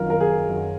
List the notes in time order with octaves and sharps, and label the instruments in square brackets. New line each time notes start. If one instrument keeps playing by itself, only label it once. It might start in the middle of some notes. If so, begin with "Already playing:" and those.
Already playing: [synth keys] F#2 D#3 F#3 [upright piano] F4 A#4
[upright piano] A#4
G#4
[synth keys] F#2 D#3 F#3